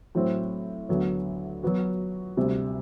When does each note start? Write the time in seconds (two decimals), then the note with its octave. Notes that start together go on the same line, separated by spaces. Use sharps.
0.15 A2 F#3 C4
0.89 D2 D3 F#3 B3
1.63 F#3 B3 F#4
2.37 D2 C3 G3